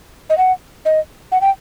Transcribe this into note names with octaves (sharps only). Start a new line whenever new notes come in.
D#5
F#5
D#5
F#5
G5